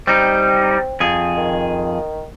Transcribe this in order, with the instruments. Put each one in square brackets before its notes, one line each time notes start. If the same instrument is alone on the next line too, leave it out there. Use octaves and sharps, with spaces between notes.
[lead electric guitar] G3 D#4 [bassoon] C4
[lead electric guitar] F2 G#4
[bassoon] D#3